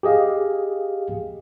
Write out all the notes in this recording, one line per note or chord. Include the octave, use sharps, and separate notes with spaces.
G4 G#4 D#5 F5